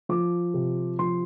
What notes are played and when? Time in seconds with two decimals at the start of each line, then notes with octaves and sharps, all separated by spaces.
0.09 F3 D6
0.54 C3
0.99 F3 C6